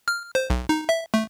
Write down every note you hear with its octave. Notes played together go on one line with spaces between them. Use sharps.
F6
C5
B1
D#4
E5
A3